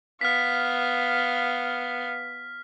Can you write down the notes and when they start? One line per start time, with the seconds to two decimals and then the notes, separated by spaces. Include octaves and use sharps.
0.21 B3 F5 F6 B6